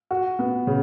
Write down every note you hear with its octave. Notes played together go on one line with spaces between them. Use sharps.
F#4
B3
C#3